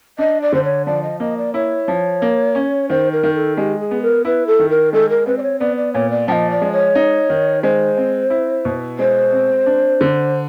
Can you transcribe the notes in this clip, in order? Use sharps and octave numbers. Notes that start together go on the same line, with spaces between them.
D4 D#5
D5
D3 C5
C#5
F3 D5
D#5
A#3 D#5
D5
E4 C#5
F3
A#3
C#4
D#3 C5
A#4
D#3
A4
G#3 G4
G#4
B3
A#4
E4 B4
A4
D#3
A#4
G#3 A4
A#4
C4 B4
D5
C#5
B3 D5
D5
A#2 C#5
D5
F3 D#5 G5
D5
G#3
C#5
D#4
D#3
G#3 C5
C4
E4
B2
G#3 C5
C4
D4
D3